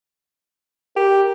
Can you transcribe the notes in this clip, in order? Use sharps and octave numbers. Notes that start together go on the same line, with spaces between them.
G4 A#4